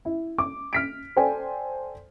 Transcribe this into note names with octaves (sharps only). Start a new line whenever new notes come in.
E4
D6
F6 B6 D7
A4 C5 D5 G5 G#5